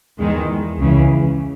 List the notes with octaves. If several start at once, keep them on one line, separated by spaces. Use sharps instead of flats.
E2 D#3 G#3
C#2 C#3 E3